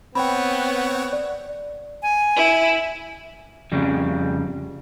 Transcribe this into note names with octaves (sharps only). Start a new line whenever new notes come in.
B3 C4 C#5 F#5 G5 B5
D5
G#5
E4
F2 C#3 G3